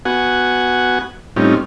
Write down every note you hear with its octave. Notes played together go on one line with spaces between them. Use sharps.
B3 F#4 F#5 G#5
A2 G3 C4 C#4 D#4 F4